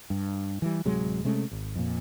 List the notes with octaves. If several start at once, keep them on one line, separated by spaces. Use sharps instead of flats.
G2
E3 G3
D1 C3 F#3 G#3
C3 G#3 A3 C#4
G#1
F2 A#2